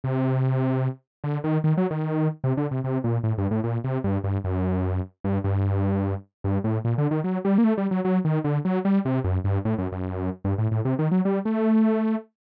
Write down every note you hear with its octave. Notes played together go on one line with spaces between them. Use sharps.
C3
D3
D#3
D#3
F#3
D#3
C3
D3
C3
C3
A#2
A2
G2
A2
A#2
C3
G2
G2
F#2
G2
G2
G2
A2
A#2
D3
D#3
F#3
G3
A#3
A3
G3
F#3
F#3
D#3
D3
F#3
G3
C3
F#2
G2
A2
F#2
F#2
G2
A2
A2
C3
D#3
F#3
G3
A3